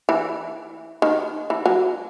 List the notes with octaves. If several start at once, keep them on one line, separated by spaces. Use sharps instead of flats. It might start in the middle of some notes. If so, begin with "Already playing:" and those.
E3
D#3
E3
F#3